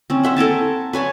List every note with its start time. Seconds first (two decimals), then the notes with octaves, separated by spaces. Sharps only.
0.10 C4 C#4
0.23 C5 E5 F#5
0.37 A4 A#4 G#5 A5
0.93 B4 C#5 G#5 A5